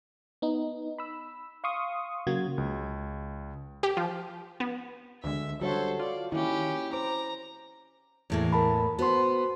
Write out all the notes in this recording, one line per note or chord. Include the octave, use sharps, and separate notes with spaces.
B3 D#4
B5 E6
F5 C6 C#6 D#6
C#3 F#3 A#3 F#4 G#6
C#2
G4
F3
B3
D2 D3 G#3 E5
D3 G3 F#4 A4 C5 C#5 F#5
F4 D5
D#3 A#3 C#4 E4 G4
C5 A#5 D6
E2 A2 A#3
A#4 A5 B5
B3 F#4 C5 C6